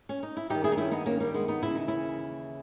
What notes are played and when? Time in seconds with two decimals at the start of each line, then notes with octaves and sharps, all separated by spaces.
0.09 C#4
0.23 D#4
0.37 E4
0.50 G2 D#3 D#4 G4
0.64 E4 G#4
0.72 D#4
0.78 C#4 E4
0.91 B3 D#4
1.06 A#3 C#4
1.20 G3 A#3
1.34 G#3 B3
1.48 B3 D#4
1.62 D#2 C#3 E3 E4
1.75 D#4
1.88 C#4 E4